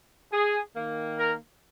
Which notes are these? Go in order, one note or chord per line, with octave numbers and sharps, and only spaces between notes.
G#4
D#3 A#3
A#4